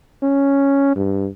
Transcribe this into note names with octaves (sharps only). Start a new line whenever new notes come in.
C#4
G2